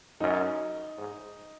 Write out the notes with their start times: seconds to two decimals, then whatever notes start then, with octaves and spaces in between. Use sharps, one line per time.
0.21 F#2 D#4
0.98 G#2